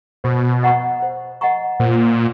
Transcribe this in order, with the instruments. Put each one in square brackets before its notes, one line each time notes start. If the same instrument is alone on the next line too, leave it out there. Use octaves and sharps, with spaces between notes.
[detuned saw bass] B2 [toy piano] C5
[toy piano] D#5 F#5 A#5 C#6
C5
D#5 F#5 A#5 C#6
[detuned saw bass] A#2 [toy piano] C5